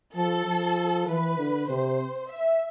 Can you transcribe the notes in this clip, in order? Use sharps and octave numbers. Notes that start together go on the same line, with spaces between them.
F3 A4
F3
E3 B4
D3
C3 C5
E5